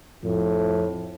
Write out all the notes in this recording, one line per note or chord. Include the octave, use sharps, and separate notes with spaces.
F2 A2